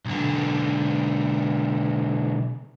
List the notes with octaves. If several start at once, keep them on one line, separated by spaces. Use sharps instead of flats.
B1 D3